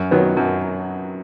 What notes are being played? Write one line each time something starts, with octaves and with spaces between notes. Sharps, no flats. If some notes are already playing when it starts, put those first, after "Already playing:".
Already playing: F#2
D#3 F#3 B3
F#2